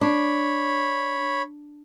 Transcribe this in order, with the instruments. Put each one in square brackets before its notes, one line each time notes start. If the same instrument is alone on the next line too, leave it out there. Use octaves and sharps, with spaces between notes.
[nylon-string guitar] D4 [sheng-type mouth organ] C#5 B5